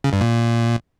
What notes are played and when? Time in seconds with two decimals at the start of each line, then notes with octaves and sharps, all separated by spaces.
0.04 C#3
0.13 G2
0.21 A#2